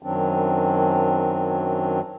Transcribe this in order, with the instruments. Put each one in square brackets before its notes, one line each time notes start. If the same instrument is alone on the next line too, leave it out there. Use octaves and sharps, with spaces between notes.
[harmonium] F#2 D#3 F#3 C4 D4